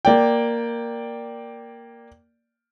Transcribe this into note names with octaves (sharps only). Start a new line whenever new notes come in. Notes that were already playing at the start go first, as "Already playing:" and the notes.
A#3 D5 G5